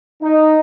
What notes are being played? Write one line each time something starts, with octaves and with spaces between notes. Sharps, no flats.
D#4